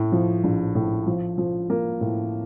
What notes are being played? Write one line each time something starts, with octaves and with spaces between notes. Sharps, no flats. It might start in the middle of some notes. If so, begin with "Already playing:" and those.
Already playing: A2
F3
A#1
A2
F3
F3
A#3
A2